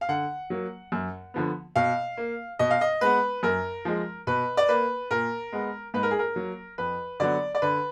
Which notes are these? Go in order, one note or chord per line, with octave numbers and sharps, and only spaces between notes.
F5
D3 F#5
F#3 A#3
F#2
D3 F3 B3
B2 F5
A#3
B2 D#5
F5
D#5
G#3 B3 B4
F#2 A#4
F3 G#3
B2 B4
D5
A#3 B4
A#2 A#4
G#3 B3
G#2 B4
A#4
G#4
A#4
F#3 A#3
F2 B4
D3 F#3 B3 D5
D5
D3 B4